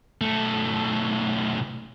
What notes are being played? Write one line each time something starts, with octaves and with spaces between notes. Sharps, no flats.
B1 A3